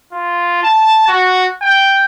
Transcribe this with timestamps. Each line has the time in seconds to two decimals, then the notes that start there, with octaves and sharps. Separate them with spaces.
0.12 F4
0.63 A5
1.08 F#4
1.62 G5